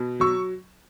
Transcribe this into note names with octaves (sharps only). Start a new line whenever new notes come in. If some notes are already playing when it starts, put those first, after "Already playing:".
Already playing: B2
F#3 C#6 E6